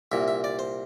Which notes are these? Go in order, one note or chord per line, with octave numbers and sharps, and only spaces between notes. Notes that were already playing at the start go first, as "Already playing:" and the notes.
C2 A#2 E5
E5
D5
C5